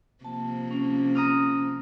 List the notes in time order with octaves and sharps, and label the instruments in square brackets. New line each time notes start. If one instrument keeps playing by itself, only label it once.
[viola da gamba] C3 F3 A#3 [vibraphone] A5
[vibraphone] C#4
[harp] A#5 D#6 F6